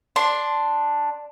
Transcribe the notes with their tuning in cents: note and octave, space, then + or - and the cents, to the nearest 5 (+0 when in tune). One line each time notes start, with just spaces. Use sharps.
D4 +0 C6 +0